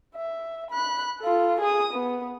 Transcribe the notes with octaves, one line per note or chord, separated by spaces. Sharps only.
E5
B5 F#6
F4 A4
G#4 D#6
B3